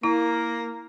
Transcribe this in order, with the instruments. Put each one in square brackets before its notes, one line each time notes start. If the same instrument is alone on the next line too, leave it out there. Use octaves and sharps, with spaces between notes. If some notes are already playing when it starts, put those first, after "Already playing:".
[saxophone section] A#3 [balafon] E4